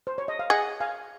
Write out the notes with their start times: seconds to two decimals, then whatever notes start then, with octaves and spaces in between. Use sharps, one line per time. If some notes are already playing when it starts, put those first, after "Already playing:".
0.07 C5
0.18 C#5
0.28 D#5
0.39 F5
0.50 G#4 D#5 F#5
0.80 F5 G#5